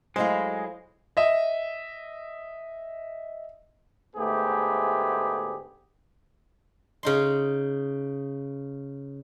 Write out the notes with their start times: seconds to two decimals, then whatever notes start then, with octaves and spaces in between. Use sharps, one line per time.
0.16 F#3 G#3 A3 E4 C5 D#5 F5
1.17 D#5 E5
4.16 D2 G#2 A3 B3 G4 G#4
7.03 C#3 D#4 C6